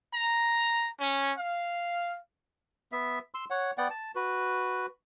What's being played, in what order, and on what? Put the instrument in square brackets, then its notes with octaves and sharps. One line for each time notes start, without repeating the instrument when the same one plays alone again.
[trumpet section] A#5
C#4
F5
[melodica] B3 E5
C6 E6
C#5 F#5
B3 D5 F#5 G5
A5
F#4 B4